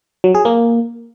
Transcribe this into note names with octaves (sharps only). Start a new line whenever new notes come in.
F#3
G#4
A#3